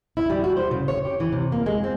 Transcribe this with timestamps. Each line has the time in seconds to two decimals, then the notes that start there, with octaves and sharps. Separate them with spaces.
0.17 E4
0.30 G3
0.44 F#4
0.57 C5
0.71 C#3
0.88 C#5
1.05 G4
1.20 E3
1.33 C3
1.52 A#3
1.66 G#3
1.84 C4